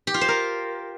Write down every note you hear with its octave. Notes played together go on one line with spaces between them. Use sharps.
G4
F4
C5
A#4